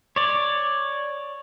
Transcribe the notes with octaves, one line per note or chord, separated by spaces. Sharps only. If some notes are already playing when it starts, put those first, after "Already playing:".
C#5 D5